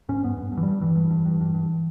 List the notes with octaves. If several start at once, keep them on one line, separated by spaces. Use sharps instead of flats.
G#2 C#4
G2 B3
G2
G2
E3
G2 G3
G2 E3
G2
G2
G2
G2
G2